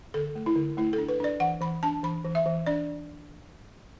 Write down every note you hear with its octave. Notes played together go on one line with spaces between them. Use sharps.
D3 A4
A3
E4
D3
A3 E4
A4
D4
B4
D4 D5
E3 F#5
E3 B5
D4 A5
E3 B5
E3
E5
E3
D4 D5